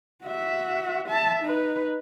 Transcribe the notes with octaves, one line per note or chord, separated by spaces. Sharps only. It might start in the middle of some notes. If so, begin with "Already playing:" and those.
F#4 E5
E5 A5
D#4 B4